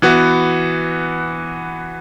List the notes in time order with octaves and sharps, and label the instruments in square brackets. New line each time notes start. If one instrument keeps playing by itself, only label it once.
[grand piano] E3 B3 F#4